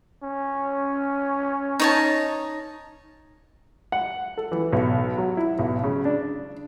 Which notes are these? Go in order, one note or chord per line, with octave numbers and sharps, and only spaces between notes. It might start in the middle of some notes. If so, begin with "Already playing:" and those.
C#4
D#4 C#5 A5
F#5
A4
E3
B1
F#3
E4
B1
C#3
D4